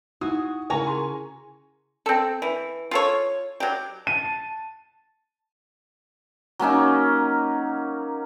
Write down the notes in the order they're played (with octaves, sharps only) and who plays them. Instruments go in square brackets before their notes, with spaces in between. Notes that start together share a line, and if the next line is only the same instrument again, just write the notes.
[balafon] D#4 E4 [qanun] F#4 G#5 [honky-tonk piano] D#6
[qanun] C#3 A#5 B5 [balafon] E4 [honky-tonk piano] A#4 G#5 C#6
[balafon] G#4 A5 C6
[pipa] C4 A4
E3
F4 A4 C#5
F#3 G4
[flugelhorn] A5 [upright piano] D#7
[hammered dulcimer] F#3 A#3 C#4 D#4